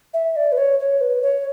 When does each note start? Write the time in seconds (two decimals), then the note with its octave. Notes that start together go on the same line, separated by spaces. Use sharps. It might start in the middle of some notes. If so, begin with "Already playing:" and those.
0.14 E5
0.36 D5
0.52 B4
0.57 C#5
0.79 C#5
1.01 B4
1.22 C#5